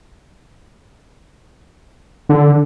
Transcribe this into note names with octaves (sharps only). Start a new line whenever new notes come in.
D3